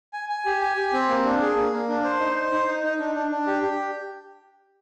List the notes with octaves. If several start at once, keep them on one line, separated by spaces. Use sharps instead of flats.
G#5
G#5
G4
G#5
G4
C4
A#3
D4
G#4
A#3
A#3
D4
C5
D#4
C5
D#4
D#4
D#4
D4
D4
D4
G4
G4